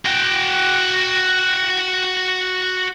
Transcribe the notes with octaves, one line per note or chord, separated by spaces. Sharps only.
F#4 G5